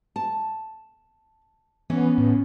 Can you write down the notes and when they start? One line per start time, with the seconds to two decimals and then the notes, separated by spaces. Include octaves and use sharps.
0.16 A5
1.90 E3 B3 C#4
2.18 A2